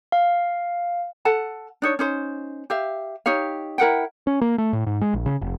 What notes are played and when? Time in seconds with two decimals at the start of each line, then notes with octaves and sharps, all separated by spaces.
0.12 F5
1.25 A4 F#5 A5
1.82 D4 D#4 C#5
1.99 C#4 D#4 C5
2.70 G4 E5 F5
3.26 D#4 G4 C#5 F5
3.78 E4 A#4 F#5 G5
4.27 C#4
4.41 A#3
4.58 A3
4.73 A2
4.87 G#2
5.01 G#3
5.14 A#1
5.26 C#3
5.41 F1